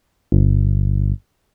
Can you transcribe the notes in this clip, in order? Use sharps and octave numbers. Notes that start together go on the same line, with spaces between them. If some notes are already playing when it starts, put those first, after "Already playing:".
G1